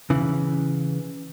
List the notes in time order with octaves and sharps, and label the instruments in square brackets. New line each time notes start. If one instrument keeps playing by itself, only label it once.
[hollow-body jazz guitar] C#3 E3